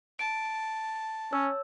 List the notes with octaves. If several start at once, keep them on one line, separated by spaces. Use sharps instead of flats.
A5 D7
C#4 C#5 E6